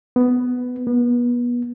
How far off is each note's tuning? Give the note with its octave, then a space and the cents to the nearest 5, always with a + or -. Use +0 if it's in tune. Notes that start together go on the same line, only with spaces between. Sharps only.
B3 +10
B3 -30